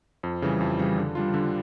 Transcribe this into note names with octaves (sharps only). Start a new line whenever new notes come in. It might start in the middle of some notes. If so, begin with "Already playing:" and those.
F2
C#3 E3 G3
F2
C#3 E3 G3
D3
G3 D4 F4
D3